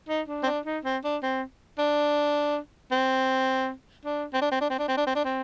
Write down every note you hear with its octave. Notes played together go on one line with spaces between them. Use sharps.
D#4
D4
C4
D4
D#4
C4
D4
C4
D4
C4
D4
C4
D4
C4
D4
C4
D4
C4
D4
C4
D4
C4